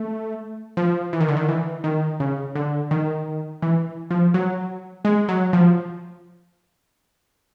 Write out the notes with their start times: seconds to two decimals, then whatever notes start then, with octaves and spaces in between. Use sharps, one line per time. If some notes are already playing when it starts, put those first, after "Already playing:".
Already playing: A3
0.77 F3
1.13 E3
1.21 D#3
1.28 D3
1.37 D#3
1.48 E3
1.84 D#3
2.20 C#3
2.55 D3
2.91 D#3
3.62 E3
4.11 F3
4.34 F#3
5.05 G#3
5.28 F#3
5.53 F3